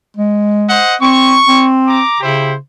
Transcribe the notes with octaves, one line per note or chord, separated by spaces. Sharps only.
G#3
C5 D#5 F#5
C4 C#6
C4
A#5 D6
C#3 E4 G4 C5